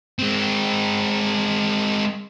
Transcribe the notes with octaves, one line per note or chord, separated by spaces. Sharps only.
G#3 C4